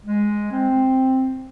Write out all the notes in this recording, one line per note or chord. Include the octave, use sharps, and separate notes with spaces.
G#3
C4